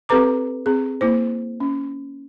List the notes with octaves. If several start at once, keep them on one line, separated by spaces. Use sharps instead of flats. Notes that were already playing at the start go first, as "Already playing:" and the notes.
C4 G4 A4 B4 A#5 D6
C4 G#4
A#3 E4 C5
C#4